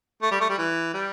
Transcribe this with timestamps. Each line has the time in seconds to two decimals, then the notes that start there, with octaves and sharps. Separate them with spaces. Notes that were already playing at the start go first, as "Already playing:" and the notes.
0.22 A3
0.32 G3
0.41 A3
0.49 G3
0.58 E3
0.94 G3